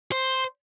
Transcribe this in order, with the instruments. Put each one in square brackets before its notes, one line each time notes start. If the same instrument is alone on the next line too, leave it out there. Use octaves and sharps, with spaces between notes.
[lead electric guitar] C5